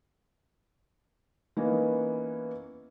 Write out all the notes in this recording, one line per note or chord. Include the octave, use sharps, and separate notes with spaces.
E3 A#3 B3 C#4 D#4